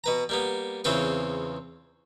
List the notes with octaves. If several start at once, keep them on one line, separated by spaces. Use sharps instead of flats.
B2 B4 A#5
G3 A#3 B3
E2 C#3 C4 F4 B4 C#6